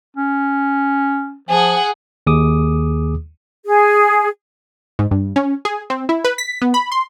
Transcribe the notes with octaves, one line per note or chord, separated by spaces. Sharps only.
C#4
F3 G#4 F#5
D#2 G#4 D6 D#6
G#4
G#2
G2
C#4
G#4
C4
E4
B4
B6
B3
B5
C6